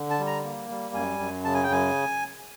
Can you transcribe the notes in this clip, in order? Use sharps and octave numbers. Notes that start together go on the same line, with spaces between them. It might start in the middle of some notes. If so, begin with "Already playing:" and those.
Already playing: D3
A5
G3
A#5
A#3
G3
F#2 G#5
F#2
C#3 A5
G#5
G5
F#2 G#5